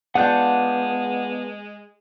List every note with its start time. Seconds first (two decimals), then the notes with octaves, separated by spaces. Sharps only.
0.15 G#3 B3 D4 F4 F#5 F#6 G6